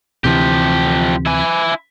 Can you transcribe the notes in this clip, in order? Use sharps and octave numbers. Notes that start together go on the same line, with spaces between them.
D2 C3 E3 F3 G4
E4 G#5